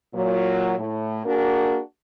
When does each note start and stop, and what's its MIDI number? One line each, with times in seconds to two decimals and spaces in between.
0.15 0.75 46
0.15 0.75 54
0.79 1.20 45
1.26 1.80 58
1.26 1.80 62
1.26 1.80 66
1.26 1.80 68
1.26 1.80 70